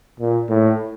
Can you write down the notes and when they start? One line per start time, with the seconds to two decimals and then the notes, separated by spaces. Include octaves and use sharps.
0.20 A#2
0.49 A2